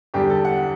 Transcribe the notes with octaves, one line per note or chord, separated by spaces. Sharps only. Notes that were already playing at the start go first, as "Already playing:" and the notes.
E2 D3 G3 G4
A4
F#5